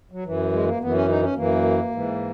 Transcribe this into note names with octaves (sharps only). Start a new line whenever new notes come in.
F#3
F#2 E3
G#3
A#3
F#2 E3 B3
C#4
D#4
C#4
F#2 E3 A#3
G#2 E3